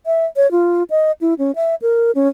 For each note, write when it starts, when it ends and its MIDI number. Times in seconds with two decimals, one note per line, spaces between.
0.06 0.26 76
0.36 0.50 73
0.51 0.83 65
0.90 1.12 75
1.21 1.34 64
1.39 1.52 61
1.56 1.75 76
1.82 2.11 70
2.15 2.28 61